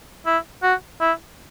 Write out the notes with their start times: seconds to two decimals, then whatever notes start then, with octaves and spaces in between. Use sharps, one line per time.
0.26 E4
0.63 F#4
1.01 E4